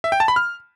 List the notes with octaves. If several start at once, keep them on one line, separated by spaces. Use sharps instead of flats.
E5
G5
A5
B5
F6